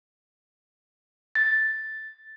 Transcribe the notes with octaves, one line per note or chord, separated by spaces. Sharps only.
A6